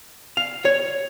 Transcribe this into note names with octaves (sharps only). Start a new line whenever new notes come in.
F5
C#5